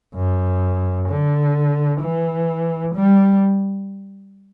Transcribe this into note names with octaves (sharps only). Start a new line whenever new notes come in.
F#2
D3
E3
G3